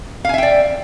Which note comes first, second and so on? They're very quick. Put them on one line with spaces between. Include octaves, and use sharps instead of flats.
F5 G#5 E5 G5 D5